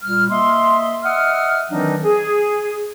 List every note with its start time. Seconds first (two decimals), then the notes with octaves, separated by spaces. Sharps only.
0.03 A#2 G3 F6
0.30 A#3 D#5 E5 C6
1.03 D#5 E5 F#5 D#6 F6
1.71 D#3 E3 F#3 C4 D4 D#4
2.03 G#4